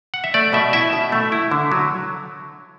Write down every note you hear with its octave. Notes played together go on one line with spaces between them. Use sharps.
F#5
E5
A3 D5
B2 E5
E4 E5
B2
A3
E4
D3
F#3